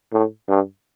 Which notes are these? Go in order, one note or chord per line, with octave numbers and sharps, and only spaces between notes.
A2
G2